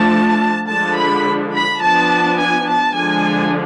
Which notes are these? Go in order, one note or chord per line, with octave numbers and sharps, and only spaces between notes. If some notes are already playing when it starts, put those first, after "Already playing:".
Already playing: F3 A3 D4 A5
D3 F3 G#3 D4 A5
B5
B5
F3 B3 D4 A5
G#5
A5
D3 F3 G#3 D4 G#5